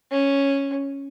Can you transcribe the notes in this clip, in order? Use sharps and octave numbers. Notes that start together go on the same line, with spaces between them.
C#4